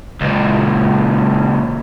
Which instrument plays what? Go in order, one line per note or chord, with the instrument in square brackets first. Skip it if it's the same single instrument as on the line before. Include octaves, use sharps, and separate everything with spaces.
[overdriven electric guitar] C#2 A#2